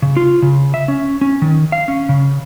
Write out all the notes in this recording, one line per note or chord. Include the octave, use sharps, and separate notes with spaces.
C#3
F4
C#3
E5
C#4
C#4
D#3
F5
C#4
C#3